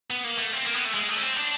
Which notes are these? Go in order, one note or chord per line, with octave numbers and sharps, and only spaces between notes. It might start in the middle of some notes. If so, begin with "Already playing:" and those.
B3
A#3
A3
C4
A#3
B3
A3
G#3
A3
C#4
C4
D4